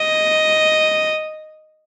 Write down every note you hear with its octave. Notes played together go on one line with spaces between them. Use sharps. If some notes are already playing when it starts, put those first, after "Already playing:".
Already playing: D#5